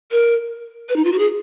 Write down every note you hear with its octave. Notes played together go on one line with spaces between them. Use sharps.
A#4
B4
D#4
F4
F#4
G#4